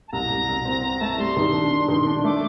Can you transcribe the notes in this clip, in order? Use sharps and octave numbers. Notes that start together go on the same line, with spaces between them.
A5
C2 A#5
C2
C2
C4
C4
A3 A5
A#5
G3 C6
D#3
D4
D4
D#3
D4
A3 D6